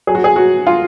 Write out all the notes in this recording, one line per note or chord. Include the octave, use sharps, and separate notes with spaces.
F#3 G#4
F#4
G#4
F#3 F#4
F4